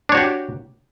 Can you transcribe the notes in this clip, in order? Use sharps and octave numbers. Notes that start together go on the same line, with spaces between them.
D4 F#4 G4 C#5